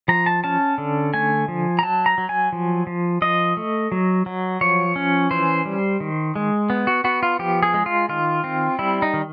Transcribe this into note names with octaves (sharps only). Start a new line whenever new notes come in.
F3 A#5
A5
C#4 A5
D3
A3 G#5
F3
A#5
F#3 A5
A#5
F#3
G#5
F3
F3
F3 D#5
A3
F#3
F#3
F3 C#5
C#4
E3 C5
G3
D#3
G#3
B3
F#4
B3 F#4
F4
F3 G4
G#4
G#3
F4
D#3 F4
C4
G3 E4
D#4
D#3